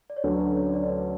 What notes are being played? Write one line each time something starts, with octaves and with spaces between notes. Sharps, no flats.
D5
C#5
D2 D3 F#3 C#4 B4
B4
C#5
D4 D5
B4